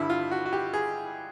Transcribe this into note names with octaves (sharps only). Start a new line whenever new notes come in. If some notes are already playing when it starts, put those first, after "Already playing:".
Already playing: G2 D3 G3 E4
F4
F#4
F#4
G4
G#4